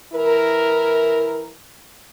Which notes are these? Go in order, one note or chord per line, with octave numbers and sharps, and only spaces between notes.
E3 E4 A#4